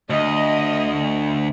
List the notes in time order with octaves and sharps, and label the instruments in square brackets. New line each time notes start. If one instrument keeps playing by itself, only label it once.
[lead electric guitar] D2 [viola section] D#5